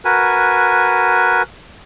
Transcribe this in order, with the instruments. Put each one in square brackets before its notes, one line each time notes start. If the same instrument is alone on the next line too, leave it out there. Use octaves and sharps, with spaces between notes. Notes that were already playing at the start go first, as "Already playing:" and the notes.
[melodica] F#4 A#4 B4 G#5